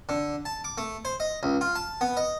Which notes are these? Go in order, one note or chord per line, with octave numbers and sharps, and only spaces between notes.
D3
A5
D6
A3
C5
D#5
C#2
F4
A5
B3
D#5